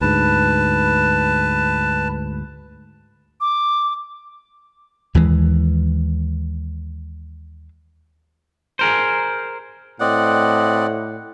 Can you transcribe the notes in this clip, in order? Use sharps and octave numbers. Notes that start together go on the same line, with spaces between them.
D2 G#2 B4 A5
D6
D#2 E3 F3 G#3
G#4 A#4 C5
A2 C4 D5 D#5 F#5